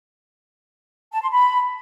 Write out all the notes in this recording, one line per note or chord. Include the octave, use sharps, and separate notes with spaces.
A5
C6
B5